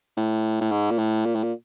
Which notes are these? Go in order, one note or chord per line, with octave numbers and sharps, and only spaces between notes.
A2
A2
G#2
A#2
A2
A#2
A2
A#2